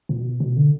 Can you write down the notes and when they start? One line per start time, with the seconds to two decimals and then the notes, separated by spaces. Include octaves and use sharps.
0.09 A#2
0.20 B2
0.40 B2
0.56 D3